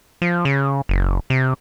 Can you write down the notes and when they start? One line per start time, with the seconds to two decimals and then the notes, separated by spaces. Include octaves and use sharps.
0.22 F3
0.45 C#3
0.89 F#1
1.30 C3